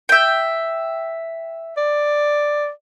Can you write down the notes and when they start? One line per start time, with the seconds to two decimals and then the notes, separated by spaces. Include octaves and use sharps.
0.09 E5 G5
1.77 D5